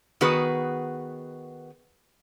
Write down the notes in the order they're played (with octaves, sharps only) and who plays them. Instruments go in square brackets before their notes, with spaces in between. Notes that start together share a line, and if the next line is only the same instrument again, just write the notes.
[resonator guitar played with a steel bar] D#3 B3 F#4 G#4 B4